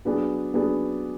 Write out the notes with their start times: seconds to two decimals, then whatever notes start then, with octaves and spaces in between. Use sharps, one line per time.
0.05 F#3 B3 D4 G#4
0.54 F#3 B3 D4 G#4